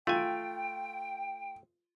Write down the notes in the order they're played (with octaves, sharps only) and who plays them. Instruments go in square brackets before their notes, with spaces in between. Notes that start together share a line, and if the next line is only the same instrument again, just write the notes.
[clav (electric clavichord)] A3 G#5 [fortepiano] F4 [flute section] G5